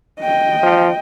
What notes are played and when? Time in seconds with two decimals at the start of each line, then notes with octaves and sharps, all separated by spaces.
0.21 D#5 G5
0.63 F3